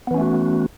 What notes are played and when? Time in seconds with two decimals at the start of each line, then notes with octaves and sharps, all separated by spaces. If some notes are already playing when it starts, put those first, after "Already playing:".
0.07 B3
0.11 E3
0.14 C#4
0.18 A3
0.21 F#4